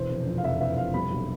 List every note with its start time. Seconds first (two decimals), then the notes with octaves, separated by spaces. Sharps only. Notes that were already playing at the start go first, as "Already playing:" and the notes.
Already playing: E1 E3 C5
0.10 F1
0.26 F2
0.38 F5
0.44 F1 E5
0.61 E3 E5
0.77 F1 F5
0.94 G3 B5
1.11 B1